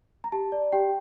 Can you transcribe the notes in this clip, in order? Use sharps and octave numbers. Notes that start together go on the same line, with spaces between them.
A#5
G4 A5
D5
G4 G5